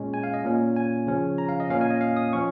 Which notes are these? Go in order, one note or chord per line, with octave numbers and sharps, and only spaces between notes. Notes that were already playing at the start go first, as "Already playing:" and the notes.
Already playing: A#2 G#3 C#4
G#5
F5
D#5
A#2 A#3 C#4
G#5
C#3 F3 C#4
A#5
F5
D#5
A#2 A#3 C#4 F5
G#5
D#5
F5
D#6
F3 C#4 C#6